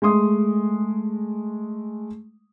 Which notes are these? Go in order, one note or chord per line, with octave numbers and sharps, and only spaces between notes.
G#3 A3 C6 D#6